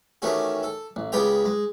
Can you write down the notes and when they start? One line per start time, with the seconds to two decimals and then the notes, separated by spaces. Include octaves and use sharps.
0.22 D#3 E3 A3 C#4 F#4 G4
0.63 A4
0.96 A1
1.12 C#2 G#3 B3 G4 G5 A#5
1.45 G#3